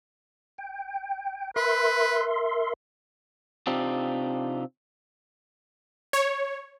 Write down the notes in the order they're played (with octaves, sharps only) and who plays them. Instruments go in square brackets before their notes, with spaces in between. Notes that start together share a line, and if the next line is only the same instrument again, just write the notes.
[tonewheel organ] G5
[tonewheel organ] A#4 E5 C6 [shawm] B4
[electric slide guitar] C3 C4 D4 D#4 F4 G4
[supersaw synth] C#5